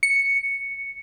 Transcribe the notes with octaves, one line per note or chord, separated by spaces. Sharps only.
C#7